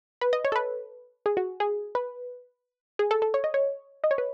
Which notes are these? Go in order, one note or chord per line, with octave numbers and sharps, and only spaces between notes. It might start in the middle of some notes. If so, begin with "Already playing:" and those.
B4
D#5
C#5
A4
B4
G#4
F#4
G#4
B4
G#4
A4
A4
C#5
D#5
C#5
D#5
C#5
B4